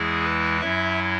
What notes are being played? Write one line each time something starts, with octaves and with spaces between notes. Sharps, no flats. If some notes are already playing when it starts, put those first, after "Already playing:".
Already playing: E2 E3 G#3 E4 G#4
B4
F#2 F#3 E4 E5